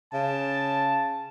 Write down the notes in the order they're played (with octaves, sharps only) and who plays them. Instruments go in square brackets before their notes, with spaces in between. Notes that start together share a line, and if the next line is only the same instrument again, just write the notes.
[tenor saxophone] C#3 [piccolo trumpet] A5